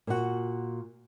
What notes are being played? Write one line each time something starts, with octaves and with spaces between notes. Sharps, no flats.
A#2 F#4